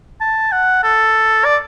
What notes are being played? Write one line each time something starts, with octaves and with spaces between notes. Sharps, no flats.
A5
F#5
A4
D5